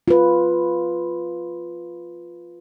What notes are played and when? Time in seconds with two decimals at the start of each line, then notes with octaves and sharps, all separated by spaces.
0.08 F4 B4